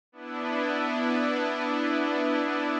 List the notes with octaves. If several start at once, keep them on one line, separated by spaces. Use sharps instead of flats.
B3 D4 E4